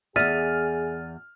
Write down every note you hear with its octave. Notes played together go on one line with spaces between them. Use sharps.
E2 G#4 D5 E5 F6 A6 D#7